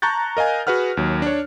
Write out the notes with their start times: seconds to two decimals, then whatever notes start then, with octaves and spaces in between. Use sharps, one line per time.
0.02 A5 A#5 C#6 F#6 G6 A6
0.37 A#4 D#5 F5 G#5
0.67 F#4 G#4 B4 F#5 F6
0.97 D#2 F#3
1.22 D4 C#5